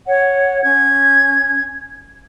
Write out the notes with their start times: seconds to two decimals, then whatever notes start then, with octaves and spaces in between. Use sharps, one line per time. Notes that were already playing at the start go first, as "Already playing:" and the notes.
0.07 C#5 F#5
0.63 C#4 G#6